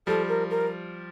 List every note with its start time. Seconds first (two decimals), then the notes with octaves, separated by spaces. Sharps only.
0.07 F3 G3 A4
0.28 A#4
0.50 A#4